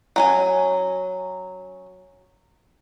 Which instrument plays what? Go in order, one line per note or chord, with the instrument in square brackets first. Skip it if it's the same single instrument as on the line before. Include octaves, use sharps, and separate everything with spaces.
[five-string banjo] F#3 C#4 G#5